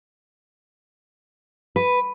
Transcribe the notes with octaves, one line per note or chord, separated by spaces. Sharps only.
B4